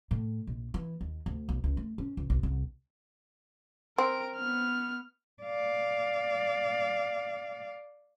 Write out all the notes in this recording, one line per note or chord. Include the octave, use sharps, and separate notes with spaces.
A2
A#1
E3
D#2
D2
B1
C#2
A3
C#4
C#2
B1
C2
C4 A#4 D7
B3 F6
D5 F5